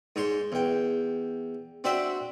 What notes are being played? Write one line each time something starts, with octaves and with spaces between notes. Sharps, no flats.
G#2 C#5 C6
E2 G5
C4 D4 F#4 E5 G5